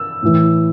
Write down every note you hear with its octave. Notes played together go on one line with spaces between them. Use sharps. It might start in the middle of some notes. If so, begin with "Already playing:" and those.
Already playing: E6
A2 E3